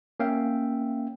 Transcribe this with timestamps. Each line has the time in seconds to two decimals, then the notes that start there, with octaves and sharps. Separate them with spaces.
0.20 A#3 C#4 E5 F5 G5